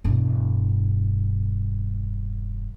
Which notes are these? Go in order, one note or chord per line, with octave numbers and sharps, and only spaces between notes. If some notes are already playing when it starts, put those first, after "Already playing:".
E1 G2